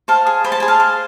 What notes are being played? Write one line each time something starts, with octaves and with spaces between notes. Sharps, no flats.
C5 F5 A5
G#4
C5 B5
A5
G#4 G#5
F5 A5
C5